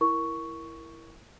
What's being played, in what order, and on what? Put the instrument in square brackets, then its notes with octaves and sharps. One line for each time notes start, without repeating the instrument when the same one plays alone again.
[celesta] E4 A#4 C#6